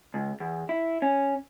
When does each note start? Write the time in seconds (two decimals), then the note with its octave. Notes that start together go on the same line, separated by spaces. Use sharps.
0.14 C#2
0.40 E2
0.69 E4
1.02 C#4